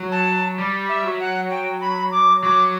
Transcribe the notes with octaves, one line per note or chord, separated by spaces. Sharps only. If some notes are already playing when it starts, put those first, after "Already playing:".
Already playing: F#3
A5
G3
E5
F#3
F#5
G5
B5
D6
F#3 D6